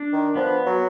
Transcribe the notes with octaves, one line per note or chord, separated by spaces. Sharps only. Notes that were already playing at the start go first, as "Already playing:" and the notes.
Already playing: D4
D#3
F3 B3
F#3